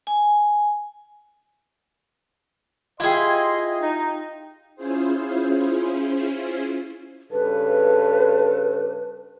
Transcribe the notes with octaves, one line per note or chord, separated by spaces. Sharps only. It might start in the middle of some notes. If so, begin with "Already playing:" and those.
G#5
E4 F4 G4 G#4 D#5 C6
D#4
C#4 E4 F4 G#4 C5
G2 C#3 A4 B4